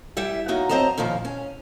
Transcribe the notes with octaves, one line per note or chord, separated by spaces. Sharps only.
G3 E4 E5
F#3 A#3 D#4 F#4
F#3 C4 C5 D#5 A5 A#5
F2 A#2 D#3 F3
C#4